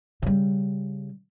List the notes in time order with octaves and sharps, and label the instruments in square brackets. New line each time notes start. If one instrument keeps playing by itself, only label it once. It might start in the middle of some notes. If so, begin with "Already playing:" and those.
[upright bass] C#3 G3